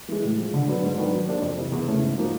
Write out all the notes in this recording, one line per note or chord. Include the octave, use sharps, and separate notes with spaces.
E3 G#3
A2
F3 G#3
D3
F#3 B3 D4
G#2
D#3 F#3 B3 D4
F#3
A#3 D4 G4 C5
F2
C3 E3
E2
C#3 E3 A3 C#4
G#2
F3 A#3 D#4 F#4